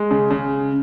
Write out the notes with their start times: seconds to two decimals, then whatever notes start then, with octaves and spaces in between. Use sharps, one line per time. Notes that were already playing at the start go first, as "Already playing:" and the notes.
Already playing: G#3
0.11 C#3
0.31 C#3